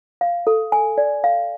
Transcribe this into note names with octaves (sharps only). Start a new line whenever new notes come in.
F5
A4
G#5
D5
F5